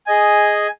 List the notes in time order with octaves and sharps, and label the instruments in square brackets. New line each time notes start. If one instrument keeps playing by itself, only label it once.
[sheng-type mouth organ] G#4 D#5 G#5